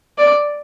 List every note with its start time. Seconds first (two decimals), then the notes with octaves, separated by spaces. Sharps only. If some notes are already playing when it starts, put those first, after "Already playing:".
0.18 D5